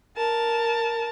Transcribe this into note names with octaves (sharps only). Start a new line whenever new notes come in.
A#4 A5